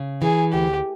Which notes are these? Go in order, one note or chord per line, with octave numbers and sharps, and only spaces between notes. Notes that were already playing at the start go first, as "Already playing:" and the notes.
Already playing: C#3
E3 G#4
D2 G4